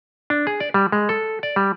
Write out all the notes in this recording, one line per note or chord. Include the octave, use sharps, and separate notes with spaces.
D4
G#4
D5
G3
G#3
A4
D5
G3